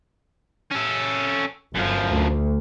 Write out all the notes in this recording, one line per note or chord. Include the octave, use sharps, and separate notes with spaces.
C#4 A4
G1 F#2 F3
D2